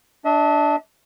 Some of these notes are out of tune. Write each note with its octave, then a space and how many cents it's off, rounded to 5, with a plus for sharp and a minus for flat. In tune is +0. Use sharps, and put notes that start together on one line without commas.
D4 +0 E5 -45